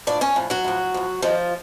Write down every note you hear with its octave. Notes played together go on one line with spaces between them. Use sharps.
A2 F3 D4 D5
C#4 C#5
A2 F3
F#3 F#4
A2 F3
A2 F3
G2 D#3 F3 F4